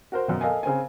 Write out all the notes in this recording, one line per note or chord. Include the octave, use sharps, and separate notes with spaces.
F#4 A#4 C5
F#2 B2
A4 A#4 D#5 F5 G#5
C#3 C4 G#5